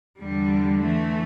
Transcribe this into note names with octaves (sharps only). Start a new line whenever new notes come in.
E2 D3 G3
E3 A3